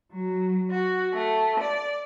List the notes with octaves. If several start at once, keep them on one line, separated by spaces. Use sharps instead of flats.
F#3
F#4
A3
D5